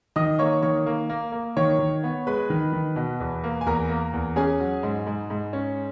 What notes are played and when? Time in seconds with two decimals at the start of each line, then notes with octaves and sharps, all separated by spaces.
0.16 D#3 D#5 D#6
0.39 A#3 C#5 C#6
0.62 D#3 C#5 C#6
0.86 A#3
1.09 A#3
1.32 A#3
1.56 D#3 C#5 C#6
1.79 D#3
2.04 B3
2.27 G#3 B4 B5
2.50 D#3
2.72 D#3
2.96 B2
3.20 E2
3.44 A#3
3.61 G#5
3.66 E2 A#4 A#5
3.89 A#3
4.13 E2
4.36 C#4 G#4 G#5
4.60 F#3
4.83 G#2
5.07 G#2
5.30 G#2
5.53 C#4